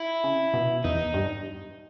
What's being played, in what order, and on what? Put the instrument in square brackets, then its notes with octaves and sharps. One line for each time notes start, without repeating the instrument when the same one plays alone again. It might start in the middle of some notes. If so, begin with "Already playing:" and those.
Already playing: [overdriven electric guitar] E4
[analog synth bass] C#3
B2
[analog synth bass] E2 [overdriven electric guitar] D#4
[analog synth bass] G2